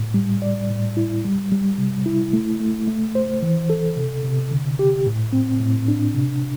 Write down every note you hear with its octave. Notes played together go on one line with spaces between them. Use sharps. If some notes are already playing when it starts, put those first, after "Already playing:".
Already playing: A2
G3
D5
A2
E4
G3
G3
C3
E4
A3
A3
A3
C5
E3
A4
C3
C3
D3
G4
A2
C4
A2
D4
C3